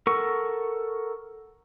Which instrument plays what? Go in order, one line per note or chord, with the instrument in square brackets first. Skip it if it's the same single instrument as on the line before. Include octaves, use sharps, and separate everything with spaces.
[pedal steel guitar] A4 A#4 F#5 C#6